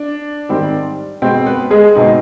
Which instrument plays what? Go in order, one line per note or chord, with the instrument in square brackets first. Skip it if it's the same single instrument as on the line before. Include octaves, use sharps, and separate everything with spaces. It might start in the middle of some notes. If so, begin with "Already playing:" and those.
Already playing: [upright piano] D4 D5
G#2 D#3 G3 C4
B2 G#3 C4 C5
B3 B4
G#3 G#4
B2 G#3 C4 D#4